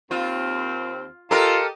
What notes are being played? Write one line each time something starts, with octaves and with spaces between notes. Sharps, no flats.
D#2 C4 F4
F4 G4 A4 A#4 D#5